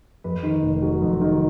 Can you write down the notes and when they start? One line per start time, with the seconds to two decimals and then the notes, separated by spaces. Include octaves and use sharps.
0.24 F2 B4
0.43 D#3
0.63 F1
0.82 F#3
1.02 F2
1.21 D#3